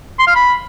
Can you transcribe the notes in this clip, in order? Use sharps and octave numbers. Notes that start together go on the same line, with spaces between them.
C6
F5
B5